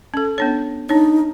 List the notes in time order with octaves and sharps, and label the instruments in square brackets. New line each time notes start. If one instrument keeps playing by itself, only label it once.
[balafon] C#4 A4
B3 D4 C#5
[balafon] D4 C#5 [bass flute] D#4